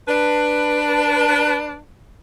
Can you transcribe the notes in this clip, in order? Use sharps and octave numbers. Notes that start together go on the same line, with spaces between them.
D4 B4